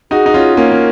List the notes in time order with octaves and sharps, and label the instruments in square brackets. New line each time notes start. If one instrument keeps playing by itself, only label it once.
[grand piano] D#4 F#4 [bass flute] G#4
[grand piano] D#4
C#4 F4
[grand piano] A#3 C#4 [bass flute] A#4
[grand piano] A#3